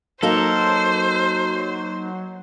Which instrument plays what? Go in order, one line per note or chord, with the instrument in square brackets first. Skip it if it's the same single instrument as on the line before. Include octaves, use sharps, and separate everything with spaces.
[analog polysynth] F#3 [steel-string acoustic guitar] A#3 D#4 A#4 [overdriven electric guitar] A4 [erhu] C5